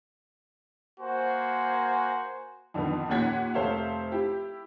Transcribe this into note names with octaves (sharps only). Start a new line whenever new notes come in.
A#3 F#4 C5 G#5
F2 D3 D#3 F3 B3
D#2 A#2 C#4 F#5 G#6 B6
F1 A4 C5 C#5 E5 F5
E4 G4